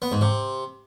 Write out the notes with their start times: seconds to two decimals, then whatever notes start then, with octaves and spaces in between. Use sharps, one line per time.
0.02 B3
0.12 G#2
0.21 C3